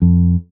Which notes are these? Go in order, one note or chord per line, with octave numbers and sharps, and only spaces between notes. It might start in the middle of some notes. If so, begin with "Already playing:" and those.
F2